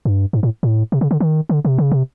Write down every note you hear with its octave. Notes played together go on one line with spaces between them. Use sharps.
G2
G#2
A2
A2
C3
C#3
D3
D#3
D3
C3
C#3
C3